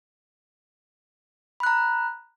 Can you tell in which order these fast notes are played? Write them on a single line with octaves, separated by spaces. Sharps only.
B5 F#6 A#5